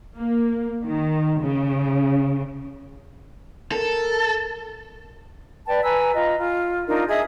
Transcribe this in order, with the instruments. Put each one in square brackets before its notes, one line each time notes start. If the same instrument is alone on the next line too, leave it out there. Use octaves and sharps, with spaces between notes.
[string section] A#3
D#3
C#3
[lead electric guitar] A4 [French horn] A#4
[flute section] B4 D5 G5 A5
B4 G#5 A#5 E6
F4 D#5 A#5
F4
D4 D#4 F4 A#4
G#4 D#5 E5 D#6